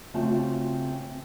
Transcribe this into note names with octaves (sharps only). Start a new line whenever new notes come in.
C#3 A3 C4 F4 F#4 A5